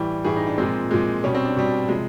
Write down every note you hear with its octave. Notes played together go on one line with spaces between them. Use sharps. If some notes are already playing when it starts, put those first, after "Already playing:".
Already playing: A2 E3 G3 D5
A2 E3 G3 G#4
D#4
D4
A#2 F3 G#3 C4
A#2 F3 G#3
B2 G3 C#4
C4
D4
B2 G3
C3 F3 G#3